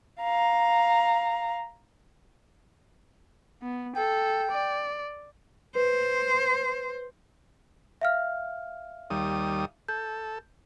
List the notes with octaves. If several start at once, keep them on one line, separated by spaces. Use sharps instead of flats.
F5 A#5
B3
A4 G5
D5
B4 C5
E5 F5 F6
D#2 G3 D#6
A4 G6